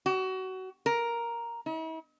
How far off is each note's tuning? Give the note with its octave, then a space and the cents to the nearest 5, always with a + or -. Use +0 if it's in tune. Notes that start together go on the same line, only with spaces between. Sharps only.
F#4 +25
A#4 +5
E4 -45